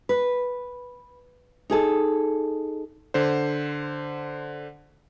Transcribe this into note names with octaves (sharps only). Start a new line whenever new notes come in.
B4
D#4 G#4 A4
D3 C5